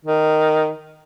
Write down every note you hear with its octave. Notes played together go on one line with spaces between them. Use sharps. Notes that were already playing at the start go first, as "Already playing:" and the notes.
D#3